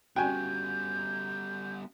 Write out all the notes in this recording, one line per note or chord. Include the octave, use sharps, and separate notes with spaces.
G3 B3 C#4 F#4 G5 G#5 G6